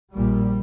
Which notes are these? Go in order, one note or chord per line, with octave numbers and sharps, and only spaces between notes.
A#1 A#2 G3